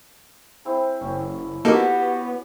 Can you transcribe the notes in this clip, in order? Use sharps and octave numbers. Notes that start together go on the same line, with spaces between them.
C4 E4 G#4
F#1 C#4
A#3 B3 D#4 F#4 G4 A4